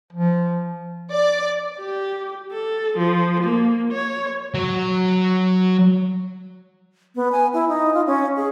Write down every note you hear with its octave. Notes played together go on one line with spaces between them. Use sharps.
F3
D5
G4
A4
F3
A#3
C#5
F#3 C#5
B3
G#5
E4
D#4
F4
C#4
G#4